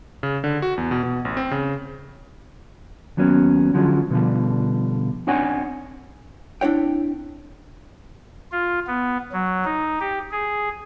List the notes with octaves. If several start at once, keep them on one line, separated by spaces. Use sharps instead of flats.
C#3
D3
F#4
E2
B2
B2
A1
C4
C#3
D#2 F#3 B3 C#4
D3 F3 F#3 G#3 C#4
B2 D3 F3 G3
C4 D4 D#4 C#5 F#5 G#5
C4 D4 E4 C#5 G5
F4
B3
F#3
D#4
G4
G#4